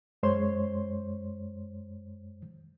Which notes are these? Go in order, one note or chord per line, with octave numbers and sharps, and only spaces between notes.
F#2 G#3 C5 C#5 C6